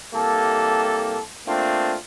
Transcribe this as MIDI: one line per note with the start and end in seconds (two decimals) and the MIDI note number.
0.14 1.19 36
0.14 1.19 58
0.14 1.19 67
0.14 1.19 69
1.46 1.96 57
1.46 1.96 58
1.46 1.96 60
1.46 1.96 62
1.46 1.96 65